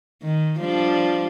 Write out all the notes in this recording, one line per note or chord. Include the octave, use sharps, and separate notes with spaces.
D#3
F3 G3 D4